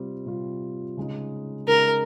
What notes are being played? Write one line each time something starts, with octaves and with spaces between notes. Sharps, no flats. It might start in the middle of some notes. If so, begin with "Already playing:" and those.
Already playing: C3 G3 C4 F4
C3 G3 C4 F4
C#3 G#3 D#4
C#3 G#3 D#4 A#4